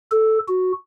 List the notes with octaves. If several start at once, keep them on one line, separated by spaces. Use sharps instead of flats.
A4
F#4